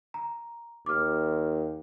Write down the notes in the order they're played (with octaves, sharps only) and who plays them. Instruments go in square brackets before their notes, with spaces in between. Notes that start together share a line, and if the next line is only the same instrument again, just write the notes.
[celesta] A#5
[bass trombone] D#2 [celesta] D6 F6